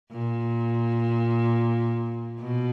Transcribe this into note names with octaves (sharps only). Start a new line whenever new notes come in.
A#2
B2